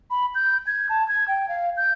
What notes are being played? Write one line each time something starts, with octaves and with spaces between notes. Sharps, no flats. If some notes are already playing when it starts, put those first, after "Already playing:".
B5
G6
G#6
A5
G#6
G5
F5
G6